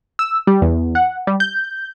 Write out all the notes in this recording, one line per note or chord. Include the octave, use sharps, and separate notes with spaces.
E6
G3
E2
F#5
G3
G6